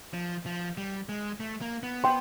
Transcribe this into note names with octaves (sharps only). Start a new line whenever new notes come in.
F3
F3
G3
G#3
A3
A#3
B3
G5 C6